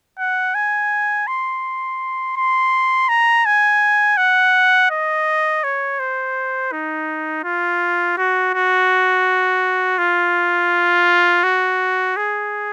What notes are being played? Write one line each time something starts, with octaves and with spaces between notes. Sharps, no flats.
F#5
G#5
C6
C6
A#5
G#5
F#5
D#5
C#5
C5
D#4
F4
F#4
F#4
F4
F#4
G#4